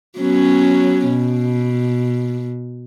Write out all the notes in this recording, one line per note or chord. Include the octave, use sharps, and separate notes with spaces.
F#3 B3 C#4
B2